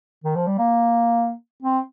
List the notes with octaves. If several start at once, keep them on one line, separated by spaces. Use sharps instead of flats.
D#3
F3
G3
A#3
C4